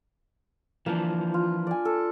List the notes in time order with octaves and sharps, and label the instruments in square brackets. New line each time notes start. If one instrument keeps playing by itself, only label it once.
[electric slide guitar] E3 F3 [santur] A#3 D4
[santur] F4
D5 G#5
A4